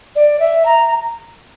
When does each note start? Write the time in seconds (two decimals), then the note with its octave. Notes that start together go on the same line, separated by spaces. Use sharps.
0.16 D5
0.40 E5
0.66 A#5